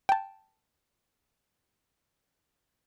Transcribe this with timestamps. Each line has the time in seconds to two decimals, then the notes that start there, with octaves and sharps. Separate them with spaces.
0.09 G5 A5